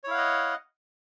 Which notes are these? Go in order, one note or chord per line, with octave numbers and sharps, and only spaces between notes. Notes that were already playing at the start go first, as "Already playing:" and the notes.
E4 C#5 D#5 F5 F#5